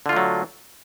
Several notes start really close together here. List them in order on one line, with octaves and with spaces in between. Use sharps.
D3 F4 A3 F#3